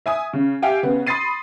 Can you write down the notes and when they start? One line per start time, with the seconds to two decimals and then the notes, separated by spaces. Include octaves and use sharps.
0.06 E5 G#5 D#6
0.33 C#3
0.62 G4 E5 F5 G5 G#5
0.83 C#3 B3
1.07 B5 C6 D#6 A6 C7 D#7